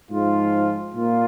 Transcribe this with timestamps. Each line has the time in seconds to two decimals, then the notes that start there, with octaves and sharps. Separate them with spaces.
0.10 G#2 F3 G#3 F4
0.93 A#2 A#3 F4